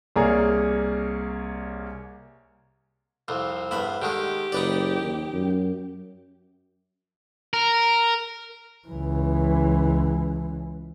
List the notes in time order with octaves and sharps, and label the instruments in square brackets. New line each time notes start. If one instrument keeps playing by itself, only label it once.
[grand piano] C2 A#3 G#4 C#5 D5 A#5
[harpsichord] C2 F2 [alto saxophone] C5
[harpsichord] E2 G2 B5
[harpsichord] D3 D#3 G#3 [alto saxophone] G4
[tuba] F#1 [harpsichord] D#4 B4 D5
[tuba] D#2
F#2
[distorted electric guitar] A#4
[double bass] C#2 E3